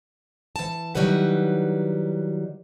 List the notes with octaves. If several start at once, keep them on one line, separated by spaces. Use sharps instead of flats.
E3 A5
D#3 F#3 G3 E4 B4 F#5